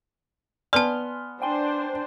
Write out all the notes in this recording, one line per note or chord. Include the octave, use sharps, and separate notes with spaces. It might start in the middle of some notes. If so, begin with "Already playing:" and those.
B3 D5 G#5 A5 C6 F6
D4 C5 G5 G#5 C6